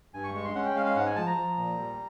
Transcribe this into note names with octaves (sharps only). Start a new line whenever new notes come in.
G2 G#5
C#6
G#3 C#6
C6
C#4 F#5
G5
G#3 F5
F5
G#2 F#5
G#5
F3 A5
A#5
F3
A#2
G3